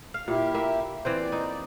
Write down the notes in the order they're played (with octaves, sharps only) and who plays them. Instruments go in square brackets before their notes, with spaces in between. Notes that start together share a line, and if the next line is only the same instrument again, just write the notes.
[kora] F5
[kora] A#2 [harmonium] E4 G4
[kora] A#3 E5
[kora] E3 C4 C5 [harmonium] D5
[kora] D#4